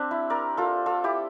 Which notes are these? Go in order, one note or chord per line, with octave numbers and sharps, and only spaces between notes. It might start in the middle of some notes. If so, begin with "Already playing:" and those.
Already playing: C4 D4 G4
E4
A#4 D5
F4 A4
F4 A4
E4 G4